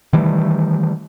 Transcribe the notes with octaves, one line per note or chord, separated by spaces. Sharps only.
D#3 E3 G3 A3